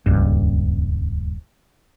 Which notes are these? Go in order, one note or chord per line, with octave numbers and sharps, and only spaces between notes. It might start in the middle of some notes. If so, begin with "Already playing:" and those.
D#1 C#2 G2